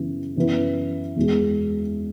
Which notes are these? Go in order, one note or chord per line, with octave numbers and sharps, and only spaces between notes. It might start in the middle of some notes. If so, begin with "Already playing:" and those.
Already playing: F#2 C#3 E3 B3 E4
F#2 E3 B3 E4
E2 B2 G#3